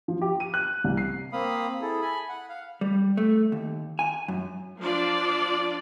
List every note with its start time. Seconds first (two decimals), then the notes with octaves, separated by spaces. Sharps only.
0.08 F3
0.22 G4
0.40 D#7
0.54 F#6
0.84 C2
0.97 C7
1.33 A#3 C4 F5 B5 D#6
1.81 E4 G#4 A4
2.02 G#5 B5
2.29 F#5
2.49 F5
2.81 G3
3.17 A3
3.52 D#2
3.99 G#5
4.28 F#2
4.80 F3 D4 F4 D5